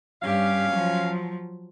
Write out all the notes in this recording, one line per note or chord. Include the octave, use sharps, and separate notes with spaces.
G2 C#4 G4 F5
F3 F#3